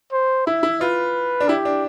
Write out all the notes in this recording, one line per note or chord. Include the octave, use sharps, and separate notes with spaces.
C5
E4 E5
E4
F4 B4
D4
E4 G4
D4